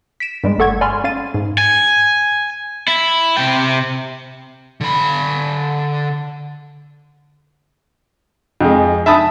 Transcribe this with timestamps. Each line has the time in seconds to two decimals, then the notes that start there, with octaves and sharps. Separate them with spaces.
0.20 B6 D7 E7
0.44 G2 G3 G#3
0.58 G1 A3 A4 F#5 C#6 G#6
0.81 D5 G#5 B5 C6 F6
1.04 C#4 F5 A6 D#7
1.34 G#2
1.58 G#5
2.88 E4
3.37 C3 G5
4.81 D3 B5
8.61 F2 G#3
9.06 E5 A5 B5 D#6